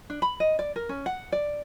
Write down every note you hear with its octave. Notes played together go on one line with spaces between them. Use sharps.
D4
B5
D#5
D5
A#4
C#4
F#5
D5